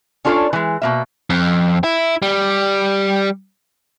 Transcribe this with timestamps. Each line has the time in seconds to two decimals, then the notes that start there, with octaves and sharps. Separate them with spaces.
0.25 C#4 D4 F4 A4 B4 C#5
0.53 E3 G#3
0.82 B2 A#3 E5
1.30 F2
1.84 E4
2.22 G3